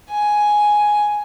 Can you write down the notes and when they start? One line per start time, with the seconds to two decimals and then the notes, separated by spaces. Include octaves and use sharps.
0.11 G#5